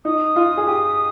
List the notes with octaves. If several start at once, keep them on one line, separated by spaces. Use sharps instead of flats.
D#4 D#6
F4
G#4
G4